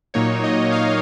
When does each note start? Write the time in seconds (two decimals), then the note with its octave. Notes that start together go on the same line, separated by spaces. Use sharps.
0.14 A#2 F#3 A#3 D#4 C#5
0.44 D#5
0.72 F5